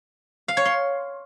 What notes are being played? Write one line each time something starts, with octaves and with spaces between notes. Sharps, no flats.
F5
C#5
C6